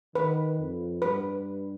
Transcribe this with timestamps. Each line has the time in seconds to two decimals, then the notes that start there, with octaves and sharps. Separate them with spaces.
0.15 D#3 B4
0.59 F2
1.02 G2 B4